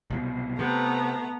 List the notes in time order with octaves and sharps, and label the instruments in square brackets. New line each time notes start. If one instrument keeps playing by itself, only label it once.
[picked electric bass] C2 B2
[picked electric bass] C3 [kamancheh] A3 A#5 [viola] B3